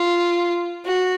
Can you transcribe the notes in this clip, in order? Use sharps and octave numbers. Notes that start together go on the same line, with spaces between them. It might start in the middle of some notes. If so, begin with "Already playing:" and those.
Already playing: F4
F#4